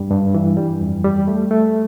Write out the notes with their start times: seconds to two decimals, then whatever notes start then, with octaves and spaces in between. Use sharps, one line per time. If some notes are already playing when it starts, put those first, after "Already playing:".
Already playing: G2 G3
0.11 G2
0.35 E3
0.57 G3
0.81 F2
1.04 G3
1.28 A3
1.51 A3